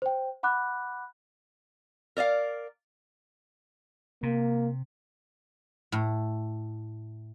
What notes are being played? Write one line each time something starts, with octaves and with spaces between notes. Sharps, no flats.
C5 G5
F#5 B5 D6 F#6
A#4 D5 D#5 F5
C3 A#3
A2